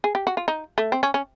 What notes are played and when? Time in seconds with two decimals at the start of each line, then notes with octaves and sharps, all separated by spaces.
0.04 G#4
0.15 G4
0.27 F#4
0.37 F4
0.48 D#4
0.78 A3
0.92 C4
1.03 C#4
1.14 C#4